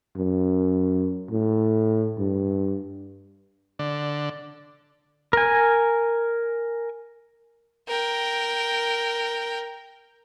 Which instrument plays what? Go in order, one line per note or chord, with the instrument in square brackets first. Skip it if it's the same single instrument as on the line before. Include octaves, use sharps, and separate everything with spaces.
[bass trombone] F#2
A2
G2
[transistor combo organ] D3
[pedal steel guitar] A#4 G#5
[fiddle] A#4 G5